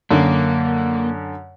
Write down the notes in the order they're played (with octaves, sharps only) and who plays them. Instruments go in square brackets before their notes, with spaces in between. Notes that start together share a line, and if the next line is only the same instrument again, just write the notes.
[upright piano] F#2 D3 [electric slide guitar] A#3